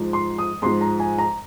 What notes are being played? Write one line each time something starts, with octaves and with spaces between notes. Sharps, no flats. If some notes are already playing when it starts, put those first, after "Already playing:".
Already playing: G#2 F3
C6
D#6
G#2 F3 C6
A#5
G#5
A#5